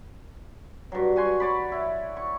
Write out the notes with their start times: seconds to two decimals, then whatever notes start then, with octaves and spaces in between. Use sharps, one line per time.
0.92 G2 F#3
1.16 F#4 G#5 C6
1.40 C#5 D5 B5
1.72 E4
2.17 C#6